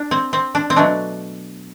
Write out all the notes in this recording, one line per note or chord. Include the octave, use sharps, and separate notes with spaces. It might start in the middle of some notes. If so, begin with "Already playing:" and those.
Already playing: D4
C4
C4
D4
C4
B2 F#3 A3 D4